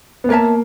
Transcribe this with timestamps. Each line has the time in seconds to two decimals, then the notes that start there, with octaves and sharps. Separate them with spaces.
0.24 B3
0.29 A#3 A#4 C#5 E5 A5